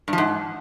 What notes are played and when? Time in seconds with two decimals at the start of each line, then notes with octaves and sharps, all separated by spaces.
0.08 G2
0.13 F3
0.18 G#2